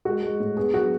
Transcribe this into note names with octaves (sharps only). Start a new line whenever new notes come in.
G#3 F#4
G#3
A2
B3 G#4
F#3 F#4